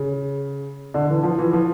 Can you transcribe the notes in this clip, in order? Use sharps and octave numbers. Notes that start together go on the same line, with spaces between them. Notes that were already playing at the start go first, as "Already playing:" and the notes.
Already playing: C#3
D3
E3
F3
E3
F3